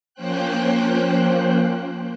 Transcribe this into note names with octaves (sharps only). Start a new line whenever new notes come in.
F3 A#3 C#4 C5 G5 F#6